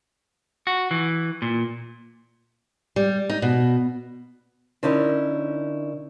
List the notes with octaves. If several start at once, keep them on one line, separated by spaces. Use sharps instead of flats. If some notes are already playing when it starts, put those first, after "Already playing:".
F#4
E3
A#2
G3
D#4
B2
D3 C#4 D#4 E4 G#4 A#4